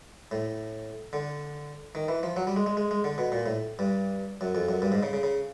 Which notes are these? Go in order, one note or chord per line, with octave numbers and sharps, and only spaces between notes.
A2
D3
D#3
E3
F3
F#3
G3
G#3
G#3
G#3
G#3
D3
B2
A#2
A2
G2
F#2
F2
F#2
G2
G#2
C#3
C#3
C#3